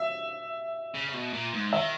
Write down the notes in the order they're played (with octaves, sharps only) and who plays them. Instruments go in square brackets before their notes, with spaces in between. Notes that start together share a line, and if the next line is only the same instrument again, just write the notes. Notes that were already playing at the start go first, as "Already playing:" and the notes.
Already playing: [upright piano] E5
[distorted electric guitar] C#3
B2
A#2
G#2
[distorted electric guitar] D#3 [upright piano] E5